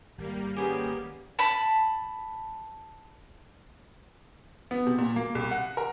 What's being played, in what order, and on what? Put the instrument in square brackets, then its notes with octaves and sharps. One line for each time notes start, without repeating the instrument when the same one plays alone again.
[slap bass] G#1 [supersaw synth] G3 A#3
[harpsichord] B3 G4 [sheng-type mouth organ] C#4 G#4 G#5
[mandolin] A5 B5
[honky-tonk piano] B3
C3
A#2
A#3
C2
F#5
A#4